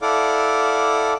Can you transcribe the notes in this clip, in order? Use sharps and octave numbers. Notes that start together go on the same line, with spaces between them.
E4 A4 D5 F5 F#5 D6